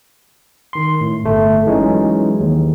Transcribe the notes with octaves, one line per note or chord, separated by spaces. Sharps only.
D#3 C6
A2
G1 A3
E3 F#3 G#3 C#4 D#4
D#2